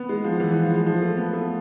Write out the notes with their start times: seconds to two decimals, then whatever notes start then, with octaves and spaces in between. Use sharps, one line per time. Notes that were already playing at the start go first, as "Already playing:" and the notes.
Already playing: B3
0.09 G#3
0.24 F3
0.40 E3
0.51 E3
0.63 F3
0.74 G#3
0.86 F3
1.02 A3
1.17 B3
1.33 A3